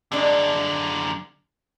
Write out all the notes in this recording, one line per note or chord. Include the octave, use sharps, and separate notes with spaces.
F#2 D3 G#3 D4